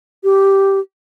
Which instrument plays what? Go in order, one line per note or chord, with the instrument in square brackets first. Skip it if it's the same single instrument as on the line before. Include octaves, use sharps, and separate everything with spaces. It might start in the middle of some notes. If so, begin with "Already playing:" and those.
[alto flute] G4